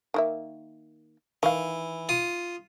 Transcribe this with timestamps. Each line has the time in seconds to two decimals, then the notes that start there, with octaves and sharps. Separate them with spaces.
0.14 D#3 A#3 E5
1.43 D#3 E3 F5
2.09 F4 D#6